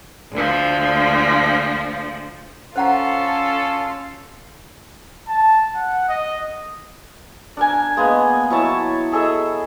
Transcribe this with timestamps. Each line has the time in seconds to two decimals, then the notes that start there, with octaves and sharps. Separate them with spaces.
0.32 D2 F3
2.76 C#4 F4 A4 C5 F#5 A#5
5.28 A5
5.75 F#5
6.09 D#5
7.57 D4 A#4 G#5
7.97 G#3 A#3 B3 D#5
8.50 F#3 E4 C#5 A5
9.12 G#4 A4 D#5 E5